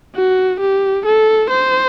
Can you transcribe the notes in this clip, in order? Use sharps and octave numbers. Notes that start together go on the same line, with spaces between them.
F#4
G4
A4
C5